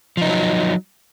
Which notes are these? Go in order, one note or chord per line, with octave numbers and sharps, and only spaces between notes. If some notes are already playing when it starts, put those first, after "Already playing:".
F3 F#3 D#4